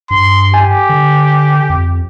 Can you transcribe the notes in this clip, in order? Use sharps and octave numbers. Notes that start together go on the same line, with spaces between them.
G2 C6
G4 G#5
D3
F2